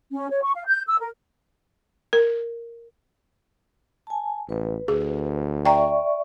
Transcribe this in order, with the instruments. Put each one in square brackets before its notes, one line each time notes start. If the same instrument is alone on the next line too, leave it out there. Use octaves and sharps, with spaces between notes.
[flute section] C#4
C#5
C#6
F5
G6
E6
A#4
[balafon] A#4
[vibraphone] G#5 A5
[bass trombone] A1 [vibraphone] B4
[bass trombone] D2 [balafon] G#4
[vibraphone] D5 E5 C#6 [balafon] G5 A#5